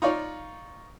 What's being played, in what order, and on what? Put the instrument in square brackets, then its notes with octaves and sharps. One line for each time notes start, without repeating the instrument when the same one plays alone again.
[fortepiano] D#4 F4 C#5 D5